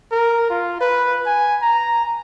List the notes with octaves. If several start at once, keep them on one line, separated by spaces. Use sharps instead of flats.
A#4
F4
B4
G#5
A#5